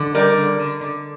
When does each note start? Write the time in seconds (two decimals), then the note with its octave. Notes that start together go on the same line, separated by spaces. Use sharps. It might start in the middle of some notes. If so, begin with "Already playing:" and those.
Already playing: D3
0.14 G3 A#4 D5
0.37 D3
0.60 D3
0.81 D3